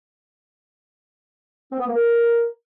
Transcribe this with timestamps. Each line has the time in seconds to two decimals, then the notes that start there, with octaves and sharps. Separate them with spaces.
1.72 C4
1.80 B3
1.87 A#3
1.95 A#4